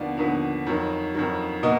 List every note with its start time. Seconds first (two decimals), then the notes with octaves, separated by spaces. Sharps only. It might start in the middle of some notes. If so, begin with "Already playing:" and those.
Already playing: D#2 D3 F3 B3 D5 F5
0.17 D#2 D3 F3 B3
0.67 F2 D#3 F#3
1.15 F2 D#3 F#3
1.63 B2 A#3 D#5 F#5